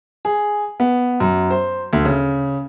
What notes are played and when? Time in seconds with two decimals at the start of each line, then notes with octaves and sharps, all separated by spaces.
0.25 G#4
0.80 B3
1.20 F#2
1.50 C5
1.93 D2
2.05 C#3